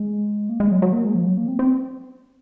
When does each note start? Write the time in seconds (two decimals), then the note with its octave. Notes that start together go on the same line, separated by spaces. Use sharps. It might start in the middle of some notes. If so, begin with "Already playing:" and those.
Already playing: G#3
0.49 A#3
0.60 G#3
0.71 F#3
0.82 F#3
0.93 A#3
1.05 G#3
1.15 F3
1.26 F#3
1.37 A#3
1.48 C4
1.59 C4